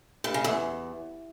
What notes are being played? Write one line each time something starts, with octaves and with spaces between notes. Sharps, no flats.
G2
C#3
E2